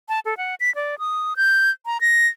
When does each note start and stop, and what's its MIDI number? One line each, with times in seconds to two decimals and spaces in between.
0.09 0.20 81
0.25 0.37 69
0.37 0.55 78
0.60 0.73 95
0.75 0.99 74
0.99 1.34 87
1.36 1.70 91
1.86 2.01 82
2.01 2.27 94